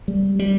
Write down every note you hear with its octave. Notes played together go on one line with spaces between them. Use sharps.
G3
G3